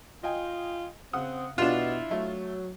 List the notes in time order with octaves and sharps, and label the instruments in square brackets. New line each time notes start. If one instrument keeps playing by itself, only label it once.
[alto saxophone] F4 [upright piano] D#5 G5 G#5
[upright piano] C#3 F#5 D#6 [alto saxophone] C4
[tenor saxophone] B2 [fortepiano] D4 F4 [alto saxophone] E4 [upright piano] G4
[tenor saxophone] F#3 [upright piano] A3